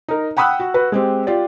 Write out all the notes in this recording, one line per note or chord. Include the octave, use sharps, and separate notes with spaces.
D#4 A#4
F#5 G5 B5 D#6 E6 F#6
F#4
F#4 B4
G#3 C4 G4
F4 G4 D5